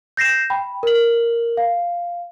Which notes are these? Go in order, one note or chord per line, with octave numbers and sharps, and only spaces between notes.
G6 A#6 C7 E7
G5 B5
A#4 F#7
F5